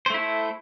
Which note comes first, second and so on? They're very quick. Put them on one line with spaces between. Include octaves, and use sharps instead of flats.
C5 A3 E4 A4